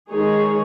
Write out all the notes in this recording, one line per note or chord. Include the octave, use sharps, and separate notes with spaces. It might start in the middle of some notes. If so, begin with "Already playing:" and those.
D#3 G#3 D#4 G#4 C#5